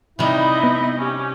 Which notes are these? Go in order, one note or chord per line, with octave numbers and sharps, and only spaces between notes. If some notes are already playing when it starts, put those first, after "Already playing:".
C3 G3 D#4 E4 D#5
B3
C#4 G4